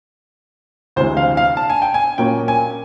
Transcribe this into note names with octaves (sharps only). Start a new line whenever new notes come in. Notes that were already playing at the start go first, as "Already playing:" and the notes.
D2 C3 E3 G#3 C5
F5
F5
A5
G#5
G5
G#5
A#2 F#3 A#3 C#4 G5
G#5